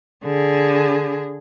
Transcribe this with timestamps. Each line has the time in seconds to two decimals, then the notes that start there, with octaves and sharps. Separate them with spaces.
0.24 D3 G#4